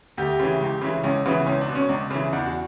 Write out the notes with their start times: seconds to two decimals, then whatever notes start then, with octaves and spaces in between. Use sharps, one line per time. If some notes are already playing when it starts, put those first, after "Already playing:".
0.17 D2 G4
0.40 C#3 E3
0.61 C#2
0.82 C#3 E3
1.03 C#2 C#4
1.25 C#3 E3 B3
1.46 C#2 C#4
1.61 D4
1.68 B2
1.75 C#4
1.89 C#2 D4
2.11 C#3 E3
2.32 E2 D4
2.46 F#4